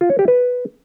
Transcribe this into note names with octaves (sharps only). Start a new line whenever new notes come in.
F4
C#5
G4
B4